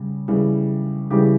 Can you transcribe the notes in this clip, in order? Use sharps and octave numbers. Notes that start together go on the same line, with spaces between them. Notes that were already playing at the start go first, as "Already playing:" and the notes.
Already playing: C#3 G3
C#3 E3 G3
C#3 E3 G3 G4